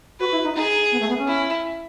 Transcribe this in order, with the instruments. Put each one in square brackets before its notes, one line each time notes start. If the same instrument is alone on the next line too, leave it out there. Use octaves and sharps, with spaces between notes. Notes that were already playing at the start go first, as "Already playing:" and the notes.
[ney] F#4 [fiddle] B4
[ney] E4
D#4
[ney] D#4 [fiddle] G#4
[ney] B3
A3
B3
C#4
[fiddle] E4